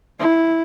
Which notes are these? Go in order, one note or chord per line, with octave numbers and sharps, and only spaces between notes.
E4